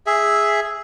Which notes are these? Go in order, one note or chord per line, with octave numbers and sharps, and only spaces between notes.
G#4 E5